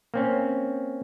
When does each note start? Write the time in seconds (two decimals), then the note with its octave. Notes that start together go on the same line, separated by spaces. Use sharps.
0.14 A#3 C4 C#4